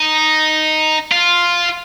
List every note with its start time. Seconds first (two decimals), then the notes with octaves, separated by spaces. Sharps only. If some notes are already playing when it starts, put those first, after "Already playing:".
Already playing: D#4
1.11 F4